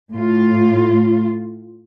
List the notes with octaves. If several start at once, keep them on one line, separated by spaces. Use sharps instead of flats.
A2 F4